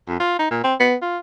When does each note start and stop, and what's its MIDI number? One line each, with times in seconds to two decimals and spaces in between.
0.08 0.19 41
0.20 0.34 65
0.39 0.50 63
0.51 0.60 46
0.64 0.75 60
0.80 0.95 59
1.02 1.18 65